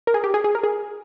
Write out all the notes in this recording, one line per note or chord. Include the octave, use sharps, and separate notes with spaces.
A#4
G#4
G4
G#4
G#4
A#4
G#4